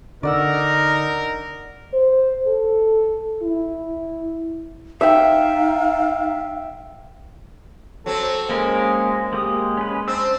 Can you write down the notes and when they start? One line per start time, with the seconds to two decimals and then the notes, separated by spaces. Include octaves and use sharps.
0.23 D3 D#4 A#4 D5 F#5 E6
1.93 C5
2.47 A4
3.42 E4
5.01 D#4 E5 F5 G5
8.06 F#3 C4 A4
8.49 G#3 A#3 C#4 A#4
9.33 G#3 A#3 G4 D#6
9.77 C#4 B4
10.08 C4 D4 C5 E6